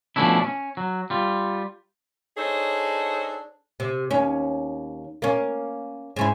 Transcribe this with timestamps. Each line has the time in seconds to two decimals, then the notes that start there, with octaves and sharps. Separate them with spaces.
0.16 B2 F3 A3 C#4 D4 E4
0.44 C#4
0.77 F#3
1.10 G3 F4
2.38 D4 D#4 G#4 A4 C5 C#5
3.80 C3
4.11 D#2 C#4
5.22 A#3 C#4
6.16 G#2 C#4 E4